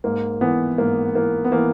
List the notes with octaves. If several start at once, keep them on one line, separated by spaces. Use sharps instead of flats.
G#2 A#3
E3 B3
G#2 A#3
E3 A#3
B3
E3 A#3